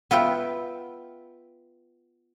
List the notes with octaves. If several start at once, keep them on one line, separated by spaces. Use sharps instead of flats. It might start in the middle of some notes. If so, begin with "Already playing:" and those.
B3 F4 E5 G5